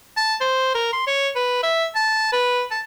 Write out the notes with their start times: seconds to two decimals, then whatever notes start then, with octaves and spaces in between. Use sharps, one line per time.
0.17 A5
0.41 C5
0.75 A#4
0.93 C6
1.07 C#5
1.36 B4
1.63 E5
1.96 A5
2.32 B4
2.71 A5